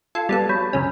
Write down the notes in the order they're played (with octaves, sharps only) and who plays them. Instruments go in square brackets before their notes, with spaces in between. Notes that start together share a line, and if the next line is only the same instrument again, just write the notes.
[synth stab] F4 A4 [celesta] G#6
[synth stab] G3 B3 A4 [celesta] A6
[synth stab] F#3 [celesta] B5 G6 B6
[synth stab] F#2 C#3 C#4